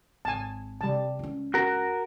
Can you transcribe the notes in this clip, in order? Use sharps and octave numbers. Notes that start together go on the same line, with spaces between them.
G#1 G#5 A5
C3 G3 A5
C#2 C#4
F#4 A#4